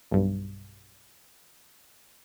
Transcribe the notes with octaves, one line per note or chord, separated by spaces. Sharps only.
B1 G2